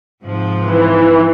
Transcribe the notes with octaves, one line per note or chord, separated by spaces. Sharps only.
G#2 C3 F3
E3